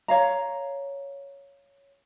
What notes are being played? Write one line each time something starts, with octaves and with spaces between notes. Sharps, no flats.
C#5 F5 A#5